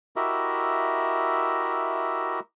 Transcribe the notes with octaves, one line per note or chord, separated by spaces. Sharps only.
E4 F#4 G4 A#4 D#5 E5